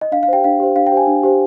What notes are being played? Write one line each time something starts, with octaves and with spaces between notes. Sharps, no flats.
D#5
D4 F5
F5
G4 C5 G5
D4 F5
G4 C5
D4 F5
G5
G4 C5
G#5
D4
G4 C5